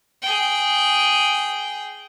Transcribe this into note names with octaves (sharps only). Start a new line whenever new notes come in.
G#4 G5